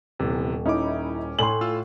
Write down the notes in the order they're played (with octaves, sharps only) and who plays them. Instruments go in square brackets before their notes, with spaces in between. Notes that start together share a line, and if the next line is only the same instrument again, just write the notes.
[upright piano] D#1 [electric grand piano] C3 E3 B3
[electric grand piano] C#4 D6 [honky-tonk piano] D#4 E4
[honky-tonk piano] A2 F#7 [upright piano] G#5 C6
[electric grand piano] F4 F5 E6